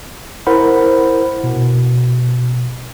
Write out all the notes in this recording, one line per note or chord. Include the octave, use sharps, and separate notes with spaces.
E4 A#4 C5 F#5 B5
B2